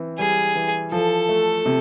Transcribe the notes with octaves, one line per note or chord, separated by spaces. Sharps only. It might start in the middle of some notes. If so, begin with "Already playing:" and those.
Already playing: E3 C4
G3 G#4
E3
F3 A4
A3
C3